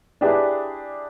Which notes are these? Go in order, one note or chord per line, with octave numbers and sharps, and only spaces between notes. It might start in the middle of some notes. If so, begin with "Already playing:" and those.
D4 E4 G4 G#4 B4